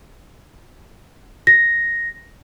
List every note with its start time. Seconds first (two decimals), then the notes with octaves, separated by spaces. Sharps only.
1.47 A#6